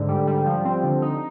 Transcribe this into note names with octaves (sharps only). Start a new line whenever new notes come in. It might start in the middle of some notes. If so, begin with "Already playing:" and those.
Already playing: G#2 D3
G3
G3
F3
C4
D3
D#4